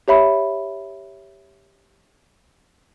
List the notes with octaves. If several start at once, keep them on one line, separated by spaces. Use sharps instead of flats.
G4 C#5 E5 B5